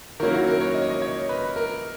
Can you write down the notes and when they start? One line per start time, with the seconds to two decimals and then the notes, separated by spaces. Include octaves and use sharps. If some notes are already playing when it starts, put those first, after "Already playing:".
0.20 D#3 F#3 A#3 C#4 E4 A#4
0.34 F#4
0.47 A#4
0.61 C#5
0.74 D#5
0.82 C#5
0.90 D#5
1.02 C#5
1.29 B4
1.56 A#4